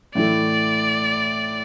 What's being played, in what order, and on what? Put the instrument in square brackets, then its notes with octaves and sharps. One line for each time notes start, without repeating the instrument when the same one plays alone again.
[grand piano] A2 E3 A3 [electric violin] D5